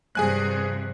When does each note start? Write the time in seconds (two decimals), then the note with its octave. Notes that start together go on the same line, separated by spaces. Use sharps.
0.15 G2 C3 F3 G#4 G#5 F#6